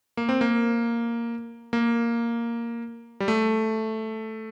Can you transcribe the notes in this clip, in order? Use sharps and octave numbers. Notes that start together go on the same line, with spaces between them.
A#3
C4
A#3
A#3
G3
A3